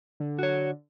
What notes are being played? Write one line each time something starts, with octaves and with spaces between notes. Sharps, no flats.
D3
F#4 C#5